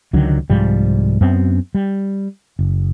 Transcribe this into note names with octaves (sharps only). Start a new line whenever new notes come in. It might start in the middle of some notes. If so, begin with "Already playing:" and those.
C#2 D3 D#3 F#3
C2 G#2 F3 G3
F#2 B3 C4
G3
F#1